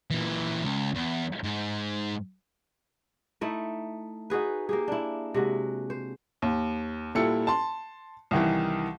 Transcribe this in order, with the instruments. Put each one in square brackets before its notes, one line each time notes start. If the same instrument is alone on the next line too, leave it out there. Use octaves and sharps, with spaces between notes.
[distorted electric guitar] A#2 E3
C#2
E2
G#2
[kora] A3 D#4 E4
D#4 F#4 G#4 B4
A#3 G4 G#4
D4 E4
C3 G#3 F#4
C5
[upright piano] D#2
A#2 G3 E4 A4 C#7
A5 C6
C2 D#3 E3